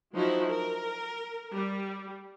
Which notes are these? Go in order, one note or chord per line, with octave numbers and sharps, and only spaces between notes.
F3 F#3 D#4 E4 F#4
A#4
G3